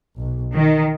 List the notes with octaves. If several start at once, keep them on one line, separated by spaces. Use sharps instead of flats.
B1
D#3